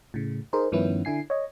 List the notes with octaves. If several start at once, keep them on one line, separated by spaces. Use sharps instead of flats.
A2 C#3
D#4 G#4 A#4 C5
G2 D#3 F3 B3 C#4 E4
D3 E4 G#5 C7
C#5 D#5